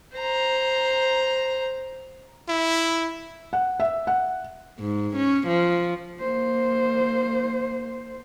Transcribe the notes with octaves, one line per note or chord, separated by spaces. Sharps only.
C5 A#5
E4
F#5
E5
F#5
G#2
C#4
F3
A#3 C5